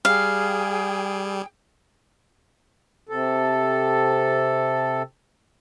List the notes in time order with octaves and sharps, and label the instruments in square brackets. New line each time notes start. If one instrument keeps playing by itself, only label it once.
[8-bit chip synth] G3 [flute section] G#4 G5 [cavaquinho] F5
[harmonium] C3 A4